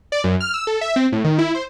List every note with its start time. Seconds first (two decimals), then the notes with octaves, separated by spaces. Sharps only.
0.12 D5
0.24 F#2
0.40 F6
0.54 E6
0.67 A4
0.81 E5
0.96 C4
1.12 A2
1.24 D#3
1.38 E4
1.55 C5